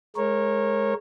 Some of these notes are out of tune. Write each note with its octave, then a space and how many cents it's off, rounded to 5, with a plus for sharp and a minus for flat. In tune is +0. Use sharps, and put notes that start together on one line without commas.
G#3 +10 A#4 +0 C#5 -25